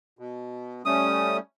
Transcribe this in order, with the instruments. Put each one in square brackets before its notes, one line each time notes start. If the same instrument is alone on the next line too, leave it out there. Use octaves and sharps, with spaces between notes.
[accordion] B2
[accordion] G3 A3 C#4 [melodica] D#6